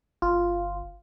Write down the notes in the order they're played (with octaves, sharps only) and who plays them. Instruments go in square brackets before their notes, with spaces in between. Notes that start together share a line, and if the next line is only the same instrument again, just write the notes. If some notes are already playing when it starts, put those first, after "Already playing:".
[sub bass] G1 [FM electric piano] F4